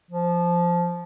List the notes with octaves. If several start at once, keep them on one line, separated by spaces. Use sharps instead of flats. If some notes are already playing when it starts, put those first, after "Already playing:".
F3